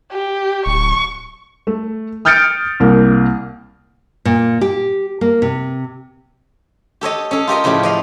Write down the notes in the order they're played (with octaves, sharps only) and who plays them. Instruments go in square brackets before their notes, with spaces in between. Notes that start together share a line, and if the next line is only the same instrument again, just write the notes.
[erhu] G4
[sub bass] D1 [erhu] C#6
[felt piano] A3
D#6 F6 G6 A6 C#7 D7
C2 A#3
[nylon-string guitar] A#2
G4
A#3
C3
[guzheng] G4 A4 C#5 D#5
C#4 G#4 A4
F4 G4 A#4 D#5
A2 C#3 F3 A3 G4
D5 D#5 F5